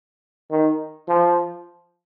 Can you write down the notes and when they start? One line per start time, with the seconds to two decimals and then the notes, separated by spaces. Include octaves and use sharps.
0.51 D#3
1.08 F3